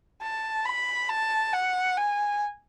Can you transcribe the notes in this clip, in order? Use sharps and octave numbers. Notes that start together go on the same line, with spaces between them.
A5
B5
A5
F#5
G#5